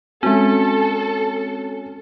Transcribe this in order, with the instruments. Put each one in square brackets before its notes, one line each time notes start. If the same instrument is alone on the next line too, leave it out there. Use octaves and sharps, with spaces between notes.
[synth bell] G#3 C4 [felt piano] C#4 F#4 [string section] A4